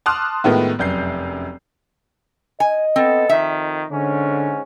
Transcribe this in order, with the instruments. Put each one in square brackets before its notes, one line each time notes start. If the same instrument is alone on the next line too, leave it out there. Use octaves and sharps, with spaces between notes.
[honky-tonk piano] A5 C6 D6 D#6 F6 F#6
A2 D#3 G#3 A3 B3 F4
F1 F#2 G6 C7
[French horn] D#5 [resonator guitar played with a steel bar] G#5
[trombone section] B3 A4 [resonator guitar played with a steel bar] C4
[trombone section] F2 D#3 [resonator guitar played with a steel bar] E5
[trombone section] G#2 C#4 [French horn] D3